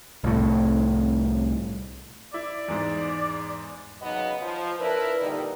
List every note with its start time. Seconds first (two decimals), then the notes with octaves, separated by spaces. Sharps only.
0.24 C2 A2
2.34 E4 D5
2.68 E2 G#2
4.02 C#3 F#3 B3 D#4 D#5
4.42 F3
4.80 D4 E4 A#4 B4
5.21 A#2 D3 D#3 G3 D#4